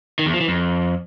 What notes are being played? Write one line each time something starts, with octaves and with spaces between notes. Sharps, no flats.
D#3
E2
F3
E3
F2